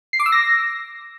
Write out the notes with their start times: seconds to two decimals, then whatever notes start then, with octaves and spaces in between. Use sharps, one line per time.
0.13 C7
0.20 D6
0.26 E6
0.32 A#6